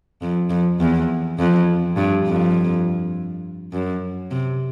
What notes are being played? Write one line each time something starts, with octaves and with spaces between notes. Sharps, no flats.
F2
F2
E2
F2
G2
F2
F#2
C3